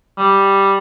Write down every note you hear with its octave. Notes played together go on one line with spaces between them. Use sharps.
G3